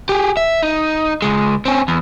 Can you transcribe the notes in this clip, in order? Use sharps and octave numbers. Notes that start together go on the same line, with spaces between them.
G4 G#4
E5
D#4
C#2 G#3
C4 C#4
E2